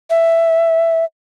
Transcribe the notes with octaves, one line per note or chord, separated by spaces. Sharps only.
E5